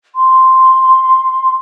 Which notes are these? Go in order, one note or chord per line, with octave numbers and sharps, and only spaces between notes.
C6